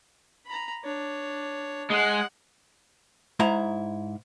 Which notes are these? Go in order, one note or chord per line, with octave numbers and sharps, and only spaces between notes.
A#5 B5
D4 C#5
G#3 F#5
G#2 E4 A#5